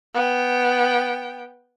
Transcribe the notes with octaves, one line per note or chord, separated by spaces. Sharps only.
B3 G5